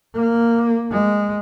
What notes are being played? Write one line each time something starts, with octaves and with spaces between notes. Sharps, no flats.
A#3
G#3